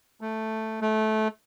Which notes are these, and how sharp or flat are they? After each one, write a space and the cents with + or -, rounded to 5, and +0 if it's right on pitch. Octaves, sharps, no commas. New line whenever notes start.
A3 +0
A3 -20